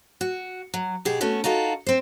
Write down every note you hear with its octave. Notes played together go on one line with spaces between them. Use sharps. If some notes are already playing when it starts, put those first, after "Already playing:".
F#4
F#3
B2 G4 G#4
A3 B3 C#4 F#4
D#4 F4 F#4 A4 F5
C4 C5